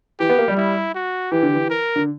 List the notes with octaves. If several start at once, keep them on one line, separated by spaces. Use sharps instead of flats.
E3 G4
B3
A#3
G3
E4
F#4
E3 G4
D3
E3
A#4
D3